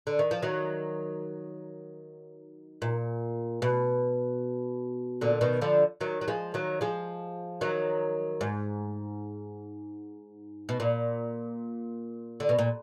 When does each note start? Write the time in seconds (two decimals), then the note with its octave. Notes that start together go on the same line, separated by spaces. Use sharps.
0.07 D3
0.19 D#3
0.31 F3
0.42 D#3 F#3
2.82 A#2
3.62 B2
5.21 A#2 D3
5.41 B2 D#3
5.61 D3 F3
6.01 D#3 F#3
6.21 F#3
6.28 F3 G#3
6.54 D#3 F#3
6.81 F3 G#3
7.61 D#3 F#3
8.41 G#2
10.69 B2
10.80 A#2
12.40 D3
12.49 B2
12.58 A#2